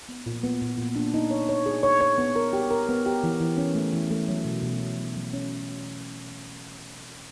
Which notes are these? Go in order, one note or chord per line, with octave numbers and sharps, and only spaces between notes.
B3
A#2
B3
A#2
A#2
D4
D#4
C#5
C#5
G#4
C#5
C#5
B3
A#4
G4
A#4
B3
G4
E3
E3
C#4
A3
E3
A3
F#3
B2
B2
B2
F#3
F#3
C#4